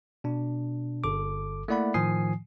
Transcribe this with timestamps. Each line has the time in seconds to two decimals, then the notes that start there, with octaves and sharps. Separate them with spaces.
0.24 B2 D4
1.04 G1 A4 D6
1.68 A3 A#3 E4 D5 F#5 B5
1.94 A2 D#3 F3 G#5 D#6 C7